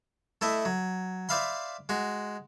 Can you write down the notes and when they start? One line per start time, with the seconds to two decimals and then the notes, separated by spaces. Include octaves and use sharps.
0.41 A3 E4 D#5 E5
0.65 F#3
1.29 C5 D5 E5 F5 B5 C6
1.89 G#3 F#4